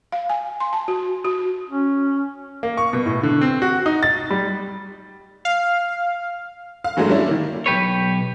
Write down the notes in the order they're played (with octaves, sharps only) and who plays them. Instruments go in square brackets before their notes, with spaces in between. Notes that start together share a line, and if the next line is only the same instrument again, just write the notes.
[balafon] F5
G#5
C6
A5
F#4
F#4
[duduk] C#4
[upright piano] A#3
C#6
B2
A2
D3
C4
F#4
D#4
A6
G3
[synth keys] F5
[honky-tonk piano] F5
G2 E3 F#3 G#3 A3
G3 C#4 D4 E4
D#3 A#3
[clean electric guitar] B1 G4 B4 C#5